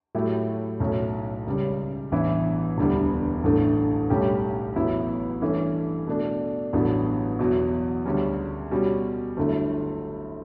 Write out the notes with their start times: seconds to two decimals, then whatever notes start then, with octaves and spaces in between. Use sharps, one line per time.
0.15 A2 F#3 A3 E4 G4
0.80 B1 A2 F#3 C#4
1.47 C#2 C#3 G3 C#4
2.12 A1 G2 E3 B3 E4
2.78 E1 D2 D3 G3 B3
3.44 A1 G2 D3 A3
4.10 B1 A2 G3 C#4 G4
4.76 A1 A2 F#3 B3 E4
5.41 G2 E3 A3 C#4
6.07 B2 A3 D4
6.73 A1 G2 D3 F#3 B3
7.39 E2 B2 F#3
8.06 D2 C#3 G3 C#4
8.71 B2 G3 C#4 F#4
9.37 G1 G2 F#3 A3 E4